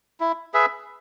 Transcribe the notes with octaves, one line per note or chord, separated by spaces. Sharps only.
E4
G#4 B4 E5